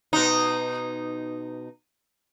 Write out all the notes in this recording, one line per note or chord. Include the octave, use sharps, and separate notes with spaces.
B2 D#4